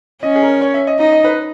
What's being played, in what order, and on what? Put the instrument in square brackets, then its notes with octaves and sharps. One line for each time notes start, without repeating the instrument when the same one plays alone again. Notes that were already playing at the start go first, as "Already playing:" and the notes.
[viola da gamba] C#4 [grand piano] D#5
[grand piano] G#4
A#4
C#5
E5
D#5
[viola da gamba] D#4 [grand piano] D#5
[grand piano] D#5
B4